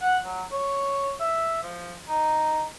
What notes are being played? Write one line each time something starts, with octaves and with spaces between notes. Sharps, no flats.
F#5
F#3
C#5
E5
F3
D#4